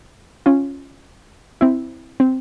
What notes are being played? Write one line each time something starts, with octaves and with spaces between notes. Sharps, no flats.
C#4 F4
C4 E4
C4